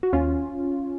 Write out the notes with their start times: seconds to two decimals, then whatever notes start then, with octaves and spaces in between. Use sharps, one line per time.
0.03 F#4
0.13 D#2 C#4 F4